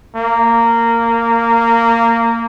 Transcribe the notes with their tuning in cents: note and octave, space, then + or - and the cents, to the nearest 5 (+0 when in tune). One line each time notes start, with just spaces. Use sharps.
A#3 -15